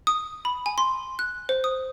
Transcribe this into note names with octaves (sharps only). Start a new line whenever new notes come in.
D#6
B5
G#5
C6
F#6
C5
D#6